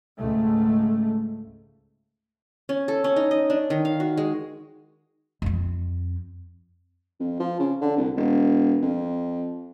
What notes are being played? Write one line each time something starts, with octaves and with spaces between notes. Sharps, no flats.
C#2 G#2 A3
C#4
A4
C#4
D#4
D#5
D4
D#3
F5
F#4
G#3
F2 C4
F2
F3
C#3
D3
C2
E1
F2